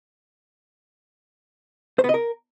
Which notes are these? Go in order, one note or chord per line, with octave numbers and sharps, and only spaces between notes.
C5
B3
D#5
A#4